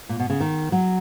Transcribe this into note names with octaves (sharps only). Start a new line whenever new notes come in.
A#2
B2
C#3
D#3
F#3